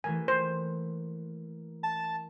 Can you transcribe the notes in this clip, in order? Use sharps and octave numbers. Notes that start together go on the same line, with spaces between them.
E3 A3 A#3 G#5
C5
A5